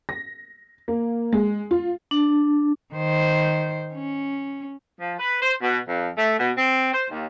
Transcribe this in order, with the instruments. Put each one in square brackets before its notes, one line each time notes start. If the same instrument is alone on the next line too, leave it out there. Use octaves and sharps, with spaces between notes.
[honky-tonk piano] A#6
A#3
G#3
F4
[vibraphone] D4
[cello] D#3 C5
C#4
[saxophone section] F3
B4
C5
B2
F2
A3
B2
C4
C5
D#2